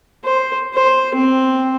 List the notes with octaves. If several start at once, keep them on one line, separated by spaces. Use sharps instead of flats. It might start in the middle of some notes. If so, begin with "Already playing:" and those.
C5
C5
C4